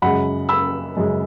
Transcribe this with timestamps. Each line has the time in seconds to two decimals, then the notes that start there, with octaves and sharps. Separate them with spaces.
0.02 F#2 C#3 G#3 F#5 B5
0.49 B5 E6
0.97 F#2 C#3 G#3